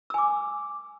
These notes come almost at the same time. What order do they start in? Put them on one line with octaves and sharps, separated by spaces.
E6 G#5 D6